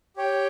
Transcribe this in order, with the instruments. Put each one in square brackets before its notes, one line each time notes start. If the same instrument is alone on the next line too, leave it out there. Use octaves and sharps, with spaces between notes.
[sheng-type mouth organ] G4 C#5 G5